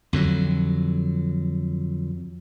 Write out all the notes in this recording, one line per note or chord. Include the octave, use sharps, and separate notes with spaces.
F2 D3 F#3